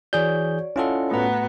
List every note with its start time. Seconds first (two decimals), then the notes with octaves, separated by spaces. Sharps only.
0.13 E3 F#4 G#4 C#5 D5 G6
0.76 C#4 E4 F4 A4 D#5 F#5
1.11 A2 A3 B3 F#4 A#5